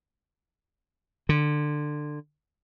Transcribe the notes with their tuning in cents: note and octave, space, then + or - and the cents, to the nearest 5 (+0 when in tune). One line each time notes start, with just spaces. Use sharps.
D3 +20